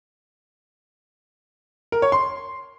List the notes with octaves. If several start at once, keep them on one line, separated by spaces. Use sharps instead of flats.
A#4
C#5
C6